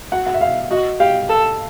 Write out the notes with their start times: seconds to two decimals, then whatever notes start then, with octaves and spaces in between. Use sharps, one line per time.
0.12 F#4 F#5
0.27 F#5
0.34 E5
0.41 F5
0.71 F#4 D#5
1.00 G4 F5
1.29 A4